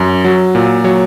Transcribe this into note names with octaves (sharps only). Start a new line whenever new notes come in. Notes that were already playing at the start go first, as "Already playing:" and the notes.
Already playing: F#2
F#3
A#2
F#3 C#5